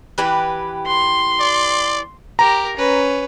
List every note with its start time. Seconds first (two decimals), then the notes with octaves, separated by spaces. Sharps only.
0.18 E3 G4 B4
0.87 C6
1.41 D5
2.39 G4 A#4 A#5
2.77 C#4 B4